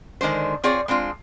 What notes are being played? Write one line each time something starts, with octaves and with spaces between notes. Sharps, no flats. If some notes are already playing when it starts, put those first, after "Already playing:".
D3 D#3 G#3 D4 C5
C4 F4 G#4 C#5 D5
G#3 C4 D4 F4